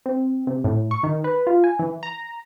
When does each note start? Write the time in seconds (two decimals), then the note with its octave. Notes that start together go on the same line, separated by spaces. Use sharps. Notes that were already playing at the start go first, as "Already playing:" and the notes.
0.06 C4
0.47 C3
0.64 A2
0.91 C#6
1.03 D#3
1.24 B4
1.47 F4
1.64 G#5
1.79 E3
2.03 A#5